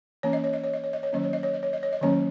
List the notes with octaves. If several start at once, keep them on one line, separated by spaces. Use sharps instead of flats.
E3 A#3 C#4 C#5
D#5
C#5
D#5
C#5
D#5
C#5
D#5
C#5
D#3 F#3 A#3 C#4 D#5
C#5
D#5
C#5
D#5
C#5
D#5
C#5
D#5
D#3 F#3 A#3 C#4 C#5